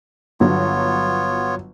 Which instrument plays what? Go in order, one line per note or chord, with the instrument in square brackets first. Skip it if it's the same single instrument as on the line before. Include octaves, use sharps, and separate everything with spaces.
[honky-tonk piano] G1 F#3 [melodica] B3 F4 C#5